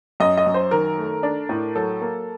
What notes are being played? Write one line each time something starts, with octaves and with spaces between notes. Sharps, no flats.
F#2 D#5
D#5
F#2
C5
D#3 A#4
A3
D4
A2
F#3 A4
A#3